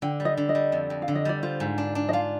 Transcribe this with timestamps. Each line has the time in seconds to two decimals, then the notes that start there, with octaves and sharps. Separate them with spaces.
0.02 D3 G5
0.20 G3
0.25 D#5
0.37 D3
0.49 D#5
0.55 G3
0.72 F2
0.90 F2
1.02 F5
1.08 D3
1.15 D#5
1.25 G3 D5
1.43 F4 C5
1.60 G#2
1.78 D4
1.95 D4
2.09 D#5
2.13 F4 F5